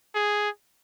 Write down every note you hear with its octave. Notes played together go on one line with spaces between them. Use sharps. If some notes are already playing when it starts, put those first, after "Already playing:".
G#4